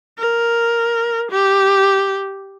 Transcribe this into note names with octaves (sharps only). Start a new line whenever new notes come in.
A#4
G4